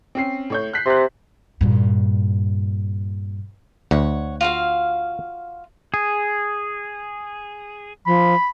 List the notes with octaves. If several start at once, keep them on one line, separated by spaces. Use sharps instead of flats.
C4 C#4 C7
A2 C#5 G6
F#6 B6 C7
C3 C6 F#6
G2 A#2
D2 C#5 F#5
F4 F#4 F5
G#4
F3 B5